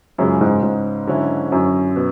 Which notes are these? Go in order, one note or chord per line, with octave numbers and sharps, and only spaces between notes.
C#2 F#2 C#3 G#3 C#4
G#2
G#2
D3 F#3 C#4 E4
F#2
B2